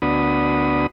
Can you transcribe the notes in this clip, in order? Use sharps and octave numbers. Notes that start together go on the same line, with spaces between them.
D2 B3 D4 F#4 B5 D#6